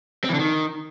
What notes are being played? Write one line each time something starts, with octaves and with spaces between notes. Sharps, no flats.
C4
E3
D3
D#3